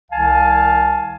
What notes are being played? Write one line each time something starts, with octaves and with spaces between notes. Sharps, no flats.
C2 D#3 F5 G#5 A5